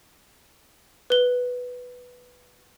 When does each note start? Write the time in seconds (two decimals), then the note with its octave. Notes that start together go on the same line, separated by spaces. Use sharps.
1.10 B4 G7